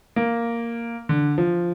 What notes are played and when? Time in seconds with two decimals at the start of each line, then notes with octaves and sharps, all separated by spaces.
0.16 A#3
1.09 D3
1.38 F3